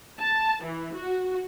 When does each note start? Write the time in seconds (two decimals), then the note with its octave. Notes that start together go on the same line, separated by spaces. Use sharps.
0.19 A5
0.64 E3
0.95 F#4